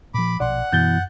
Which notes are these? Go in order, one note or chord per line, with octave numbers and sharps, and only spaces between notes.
A#2 F3 B5 D6
A#1 B2 D5 F#5 C6
F#2 B2 E3 G6 A6 G7